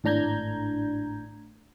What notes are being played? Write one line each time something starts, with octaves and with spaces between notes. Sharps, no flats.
G#1 A2 D4 A#5 G6 G#6